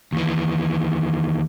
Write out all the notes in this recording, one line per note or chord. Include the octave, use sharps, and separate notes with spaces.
D#2 E3